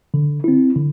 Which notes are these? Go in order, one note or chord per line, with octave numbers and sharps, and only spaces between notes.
D3
C4 E4
D3